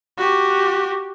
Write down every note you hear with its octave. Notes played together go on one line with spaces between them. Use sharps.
F#4 G4